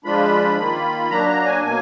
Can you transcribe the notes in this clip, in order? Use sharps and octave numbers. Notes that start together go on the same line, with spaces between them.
F3 G#3 D4 F4 B5
D#3 A#3 F4
F#3 A#3 D4 A#5
A#5
G#5
B2 F#3 A#3 G#5